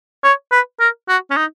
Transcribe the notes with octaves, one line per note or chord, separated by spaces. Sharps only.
C#5
B4
A#4
F#4
C#4
D#4